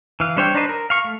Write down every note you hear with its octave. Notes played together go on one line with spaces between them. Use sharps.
E3 F5
G3 D4 C5 C#5 G5
D4 D#4 B4 C5 D#5
A#4
F5 C#6
A3